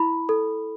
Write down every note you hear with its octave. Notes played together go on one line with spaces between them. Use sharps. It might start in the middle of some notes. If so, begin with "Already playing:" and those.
Already playing: E4 B5
A4